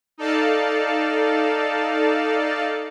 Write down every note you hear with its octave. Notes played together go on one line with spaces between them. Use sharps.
D#4 A4 D5 F5 A5